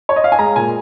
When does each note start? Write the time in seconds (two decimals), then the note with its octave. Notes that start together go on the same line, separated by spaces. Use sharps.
0.09 C#5
0.16 D#5
0.24 F5
0.32 G#5
0.39 G#3 A#5
0.56 A#2 G#5